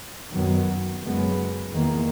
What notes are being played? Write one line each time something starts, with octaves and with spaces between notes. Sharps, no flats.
F#2 D#3 F#3 B3
F#2 C#3 G#3 B3
E2 D#3 A#3